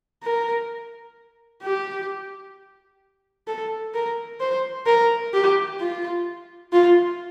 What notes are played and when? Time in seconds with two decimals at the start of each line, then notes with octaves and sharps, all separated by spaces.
0.23 A#4
1.63 G4
3.48 A4
3.94 A#4
4.41 C5
4.87 A#4
5.34 G4
5.80 F4
6.72 F4